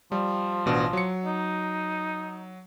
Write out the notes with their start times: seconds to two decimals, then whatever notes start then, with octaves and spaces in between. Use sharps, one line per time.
0.12 F3 G3
0.66 A1 B2 D4
0.93 F#3 C#7
1.25 D#4